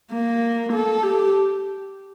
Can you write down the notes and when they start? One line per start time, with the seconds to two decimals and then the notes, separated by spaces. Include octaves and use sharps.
0.12 A#3
0.73 A4
1.03 G4